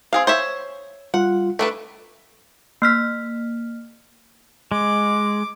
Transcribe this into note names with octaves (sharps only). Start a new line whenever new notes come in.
C4 G#4 F5
C5 C#5 E5
G3 F4 F#5
A3 D4 A4 B4
A#3 F6 B6
G#3 D6